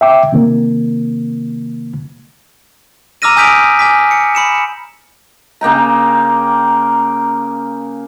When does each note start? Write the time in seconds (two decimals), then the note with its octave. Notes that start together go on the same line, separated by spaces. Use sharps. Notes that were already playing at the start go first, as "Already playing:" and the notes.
0.01 E5 G5 D6
0.33 C3 D#3 A#3
3.22 A#5 D6 E6 F6 A#6 D#7
3.37 G#5 D#6 G6 B6 D7 F7
3.79 G#5 D6 B6
4.11 C#7
4.35 B5 C#7 E7
5.61 C#3 A#3 G5 A#5